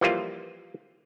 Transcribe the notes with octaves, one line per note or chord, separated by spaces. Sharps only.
E3 F3 G3 A#3 F4